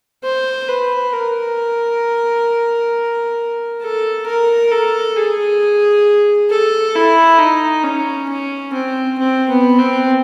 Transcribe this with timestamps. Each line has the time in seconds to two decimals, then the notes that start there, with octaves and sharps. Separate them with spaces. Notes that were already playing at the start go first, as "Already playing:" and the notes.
0.24 C5
0.68 B4
1.13 A#4
3.82 A4
4.27 A#4
4.71 A4
5.16 G#4
6.50 A4
6.95 E4
7.39 D#4
7.84 C#4
8.29 C#4
8.74 C4
9.19 C4
9.49 B3
9.79 C4